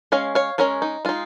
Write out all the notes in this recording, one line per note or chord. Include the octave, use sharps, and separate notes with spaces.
G#3 C#4 C#5 F5
C#5 F5
G#3 C#4 A#4 C#5
D#4
G#3 D#4 F4